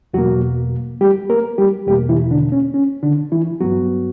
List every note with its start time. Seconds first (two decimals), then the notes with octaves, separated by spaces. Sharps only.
0.14 E2 B2 F#3 A#3 F#4
1.01 G3 G4
1.30 A#3 A#4
1.58 G3 G4
1.87 E2 B2 G3 A#3 G4
2.09 E3 E4
2.31 D3 D4
2.52 C#4
2.74 C#4
3.02 D3 D4
3.32 E3 E4
3.60 G2 F#3 B3 F#4